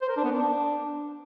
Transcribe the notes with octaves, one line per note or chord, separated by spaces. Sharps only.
C5
A#4
D4
B3
D4